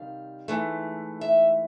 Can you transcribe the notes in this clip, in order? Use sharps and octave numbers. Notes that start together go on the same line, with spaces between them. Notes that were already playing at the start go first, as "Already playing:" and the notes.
Already playing: C3 D#3 G3 F5
G#2 E3 A3
E5